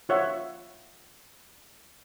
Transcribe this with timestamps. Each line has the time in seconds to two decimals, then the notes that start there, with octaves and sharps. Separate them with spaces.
0.09 F4 C#5 E5 F#5